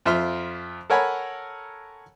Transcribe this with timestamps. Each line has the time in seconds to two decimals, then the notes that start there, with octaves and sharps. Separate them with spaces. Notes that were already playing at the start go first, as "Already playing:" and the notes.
0.05 F2 F4 E5 C6 F6
0.90 A4 A#4 C#5 F#5 G#5 B5